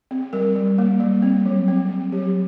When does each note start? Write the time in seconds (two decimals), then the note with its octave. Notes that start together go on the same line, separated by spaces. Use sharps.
0.11 C4
0.33 G3 A#4
0.55 G3
0.78 A#3
1.00 G3
1.22 C4
1.46 F#3
1.68 C4
1.90 C4
2.12 F#3 G4